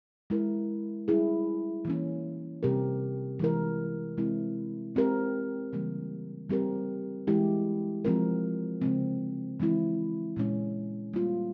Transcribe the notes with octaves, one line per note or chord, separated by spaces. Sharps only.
G#3 E4 A#4
G3 C#4 E4 G#4
E3 A#3 C#4
C3 G3 C4 G4 A#4
E3 G#3 E4 A#4
C3 E3 G#3 C4 E4
G#3 C4 G4 A#4
C#3 E3 G3 A#3
G3 C4 G4 A#4
E3 G#3 E4 G4
F3 G#3 C4 F4 A#4
C#3 F3 G#3 C4
E3 G#3 C4 E4
A#2 G#3 C#4
G3 A#3 F4